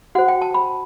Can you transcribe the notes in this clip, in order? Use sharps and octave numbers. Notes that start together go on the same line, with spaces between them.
F#4 C5 F#5
G5
A5
B5